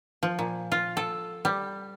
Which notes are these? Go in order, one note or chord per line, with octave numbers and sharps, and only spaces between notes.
F3
A#2
F4
A4
G3